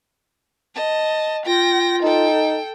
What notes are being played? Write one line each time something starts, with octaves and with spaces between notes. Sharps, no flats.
D#5 A5
F4 G5 A#6
D#4 A4 G5